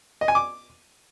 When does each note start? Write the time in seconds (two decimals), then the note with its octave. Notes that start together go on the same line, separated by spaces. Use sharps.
0.21 D#5
0.28 G#5
0.35 D6